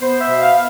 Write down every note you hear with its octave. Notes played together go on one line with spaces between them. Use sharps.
B3 C5
E5
B2
F5